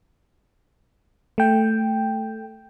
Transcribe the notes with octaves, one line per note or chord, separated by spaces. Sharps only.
A3 G5